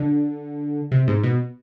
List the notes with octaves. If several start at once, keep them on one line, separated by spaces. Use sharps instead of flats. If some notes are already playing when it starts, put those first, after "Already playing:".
Already playing: D3
C3
G#2
B2